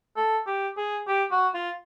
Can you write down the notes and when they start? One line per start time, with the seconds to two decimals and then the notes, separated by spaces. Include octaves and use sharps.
0.16 A4
0.47 G4
0.77 G#4
1.08 G4
1.31 F#4
1.54 F4